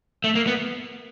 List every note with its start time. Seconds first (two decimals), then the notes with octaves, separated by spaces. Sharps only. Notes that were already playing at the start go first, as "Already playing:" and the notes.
0.24 A3
0.35 A#3
0.47 B3